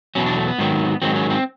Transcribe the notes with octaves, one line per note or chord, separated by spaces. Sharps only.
E2 B2 F#3 C#4
D4
A3
B3
G#2 D#3 F#3
G#2 D#3 F#3 C4
C#4
C4